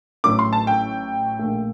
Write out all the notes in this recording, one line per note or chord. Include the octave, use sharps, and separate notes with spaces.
A1 A2 F#3 A3 D6
C6
A5
G5
A#1 A#2 A3